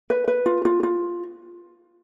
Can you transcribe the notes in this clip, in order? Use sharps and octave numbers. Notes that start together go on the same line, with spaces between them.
B4
B4
F4
F4
F4